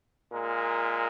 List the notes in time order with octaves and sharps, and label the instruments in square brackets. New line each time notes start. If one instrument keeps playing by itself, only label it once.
[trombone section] A#2 G#3 A#4